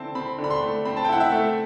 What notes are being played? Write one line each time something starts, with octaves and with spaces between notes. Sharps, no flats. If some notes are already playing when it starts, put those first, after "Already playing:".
Already playing: D3 C4 E4 A5
C4 B5
D3
B5
C6
A3
C4 B5
A5
G5
E4 F#5
E5
A3